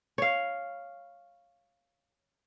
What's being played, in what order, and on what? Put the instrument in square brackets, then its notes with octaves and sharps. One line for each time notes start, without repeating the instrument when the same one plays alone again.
[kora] C#5 F5